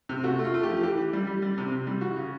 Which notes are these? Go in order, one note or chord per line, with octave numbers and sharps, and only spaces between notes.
C3
A3 F#4
A3
F4
A3
G4
F3
E3 G4
E3
G3
G3
G3
C3
C3
G3
E3 F#4
C#3